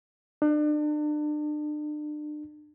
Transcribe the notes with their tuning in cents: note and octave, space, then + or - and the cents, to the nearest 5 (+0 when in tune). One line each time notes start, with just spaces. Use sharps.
D4 +35